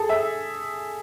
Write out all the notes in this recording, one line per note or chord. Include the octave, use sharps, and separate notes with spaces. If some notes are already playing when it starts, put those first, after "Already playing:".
Already playing: G#4 A4
E5